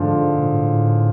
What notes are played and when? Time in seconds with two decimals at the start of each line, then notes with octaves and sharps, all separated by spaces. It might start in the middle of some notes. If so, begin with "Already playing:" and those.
Already playing: G#2 D3 F3 G#3
0.37 A#2
0.47 A2